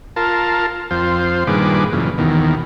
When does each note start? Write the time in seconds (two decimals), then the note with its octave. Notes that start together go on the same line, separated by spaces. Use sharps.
0.16 F4 A#4 A5
0.91 F2 F4 C5
1.47 G2 A#2 D#3 G#4 B4 D6
1.93 F#2 A#2 C#3 E3
2.18 D#2 B2 D#3 E3